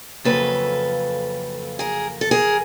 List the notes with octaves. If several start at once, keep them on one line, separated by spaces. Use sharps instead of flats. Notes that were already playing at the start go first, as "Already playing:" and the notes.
F2 C#3 F#3 A#3 A4 B4
G#4 A#4
A4
G#4 A#4